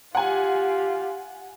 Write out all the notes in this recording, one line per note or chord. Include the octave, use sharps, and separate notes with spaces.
F4 G4 F#5 G#5